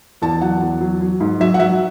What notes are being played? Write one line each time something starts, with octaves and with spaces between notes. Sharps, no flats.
E2 A5
F#3 F#5
E2
F#3
F#3
G#2
F#3 E5
F#5
F#3 E5